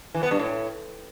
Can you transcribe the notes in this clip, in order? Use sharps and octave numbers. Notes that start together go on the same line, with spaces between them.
E3
B3
G2
A2